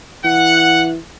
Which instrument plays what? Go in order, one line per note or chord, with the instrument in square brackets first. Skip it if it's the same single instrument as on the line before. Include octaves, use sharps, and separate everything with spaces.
[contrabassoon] E3 [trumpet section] F#5